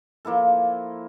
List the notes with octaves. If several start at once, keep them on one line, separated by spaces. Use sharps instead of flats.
F3 A#3 E4 A4